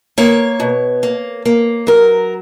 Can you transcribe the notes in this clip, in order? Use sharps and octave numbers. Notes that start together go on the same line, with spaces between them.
A#3 C#5
B2
A#3
A#3
F#3 A#4